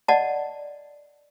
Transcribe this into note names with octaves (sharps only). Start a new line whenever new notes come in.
D5 D#5 F#5 A5